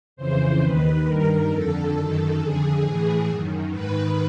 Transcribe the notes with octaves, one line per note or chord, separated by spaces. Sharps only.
F2 C#3 E3 C5
D#2 D#3 B4
G2 D#3 A#4
F2 D3 A4
F#2 D#3
F2 D3 G#4
A2 E3
F#2 D#3
G#2 D#3 B4